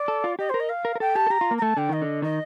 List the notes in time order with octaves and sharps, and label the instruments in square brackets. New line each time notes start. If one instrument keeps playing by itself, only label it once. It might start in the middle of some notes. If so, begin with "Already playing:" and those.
Already playing: [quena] D5
[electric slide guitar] A4
F4
[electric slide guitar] G4 [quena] D#5
[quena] C5
[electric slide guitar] A#4
[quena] D#5
F5
[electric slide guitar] A#4
A#4
[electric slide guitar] A4 [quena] G5
[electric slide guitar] G4 [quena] A5
[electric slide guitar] A4
[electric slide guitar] G4 [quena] A#5
[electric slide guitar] F4
A#3
[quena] A#5
[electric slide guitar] A3 [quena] A5
[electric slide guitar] D3 [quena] G5
[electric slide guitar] D#3 [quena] D#5
[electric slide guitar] D3
[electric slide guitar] D#3 [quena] D#5